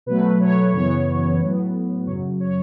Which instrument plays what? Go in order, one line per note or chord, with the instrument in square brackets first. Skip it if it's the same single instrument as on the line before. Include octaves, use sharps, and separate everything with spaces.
[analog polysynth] B2 F#3 A3 B4
C#5
F#2 C#3 E3 B3 C#5
A2 F#3 B3
F#2 C#3 F#3 C#5
C#5